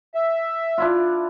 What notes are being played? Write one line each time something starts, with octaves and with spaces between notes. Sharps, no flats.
E5
D4 E4 F4